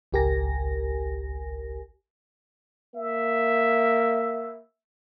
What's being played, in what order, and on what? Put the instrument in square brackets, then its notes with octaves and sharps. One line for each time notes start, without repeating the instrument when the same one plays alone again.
[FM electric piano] G#1 C#2 G4 A#4 G#5 A#6
[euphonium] A#3 [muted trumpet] E5